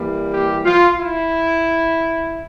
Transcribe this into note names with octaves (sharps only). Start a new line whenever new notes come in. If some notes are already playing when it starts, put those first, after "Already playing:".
Already playing: E3 G3 A#3
G4
F4
E4